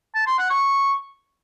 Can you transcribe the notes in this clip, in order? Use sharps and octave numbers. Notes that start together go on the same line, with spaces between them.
A5
C6
F#5
C#6